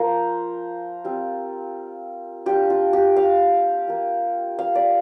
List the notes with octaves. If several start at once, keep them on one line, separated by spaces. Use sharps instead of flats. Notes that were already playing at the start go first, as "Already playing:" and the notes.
Already playing: F3 A#3 F4 A#4 C5
G3 C4 F4
G3 D4 F4 G4
F4
G4
F5
A#3 F4
F5
D5